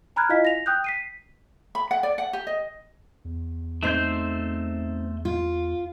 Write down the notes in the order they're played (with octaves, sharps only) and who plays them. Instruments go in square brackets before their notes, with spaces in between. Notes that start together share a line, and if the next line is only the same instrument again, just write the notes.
[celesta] G#5 A#5 B5 F6 F#6 G#6
E4 F4 D#5 F5 G#5 B6
A#6 F7
G5 D#6 F#6 G6
B6 C7 D#7
[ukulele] B5
F#5
D5
F#5
G4
D#5
[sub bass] E2
[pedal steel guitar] A3 C5 G6 [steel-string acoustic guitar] C4 D#4
[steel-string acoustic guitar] F4